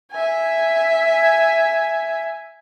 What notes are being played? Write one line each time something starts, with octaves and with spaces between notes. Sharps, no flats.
E5 G#5